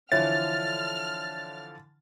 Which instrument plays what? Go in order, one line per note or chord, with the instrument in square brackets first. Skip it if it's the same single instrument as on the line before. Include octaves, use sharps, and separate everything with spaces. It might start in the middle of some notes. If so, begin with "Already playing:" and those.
[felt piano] D3 E3 F3 [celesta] C#5 E5 [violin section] F6 [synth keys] A6